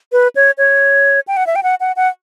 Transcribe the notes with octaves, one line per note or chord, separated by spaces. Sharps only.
B4
C#5
C#5
G5
F#5
E5
G5
F#5
F#5
F#5